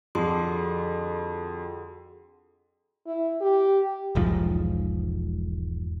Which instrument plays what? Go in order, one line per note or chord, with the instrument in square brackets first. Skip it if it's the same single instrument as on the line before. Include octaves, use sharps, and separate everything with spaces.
[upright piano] F2 [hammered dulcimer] D3 A4 D5 [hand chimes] F#4 G#4 C6
[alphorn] E4
G4
[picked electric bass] E1 B1 G#2 F3